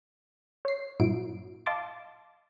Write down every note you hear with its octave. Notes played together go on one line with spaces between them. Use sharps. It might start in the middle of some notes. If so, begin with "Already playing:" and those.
C#5 C7
G2 A#2 F#3 E4 D7
D#5 F5 A5 C6 D6 A6